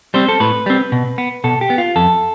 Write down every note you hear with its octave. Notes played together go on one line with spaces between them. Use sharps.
G3 C4 C5
A4
A2 B4
G3 C4
B2
B3
B2 A4
G4
B3
F4
F2 A4